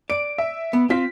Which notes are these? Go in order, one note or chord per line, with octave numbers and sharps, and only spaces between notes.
D5 D7
E5
B3
C4 F4 B6